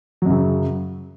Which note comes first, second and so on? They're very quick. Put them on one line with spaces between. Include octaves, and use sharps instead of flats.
F#3 F#2 C#3